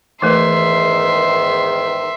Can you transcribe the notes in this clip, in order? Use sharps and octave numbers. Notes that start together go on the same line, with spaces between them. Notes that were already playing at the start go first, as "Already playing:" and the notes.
E2 G#2 D#3 E3 A3 B4 E5 C6